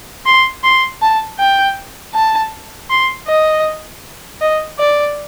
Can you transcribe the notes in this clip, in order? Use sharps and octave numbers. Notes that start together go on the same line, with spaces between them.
C6
C6
A5
G5
A5
C6
D#5
D#5
D5